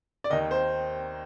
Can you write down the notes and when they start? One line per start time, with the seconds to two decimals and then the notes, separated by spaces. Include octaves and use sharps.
0.24 D5
0.30 D#2 D#3 D#5
0.51 C5